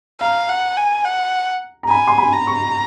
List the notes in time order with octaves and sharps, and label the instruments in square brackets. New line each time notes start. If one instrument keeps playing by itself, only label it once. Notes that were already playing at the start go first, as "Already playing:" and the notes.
[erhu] F5 [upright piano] A#5
[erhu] F#5
G#5
F#5
[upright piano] A#5
[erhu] G#5 [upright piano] B5
[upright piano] C6
B5
[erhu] A#5
[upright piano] C#6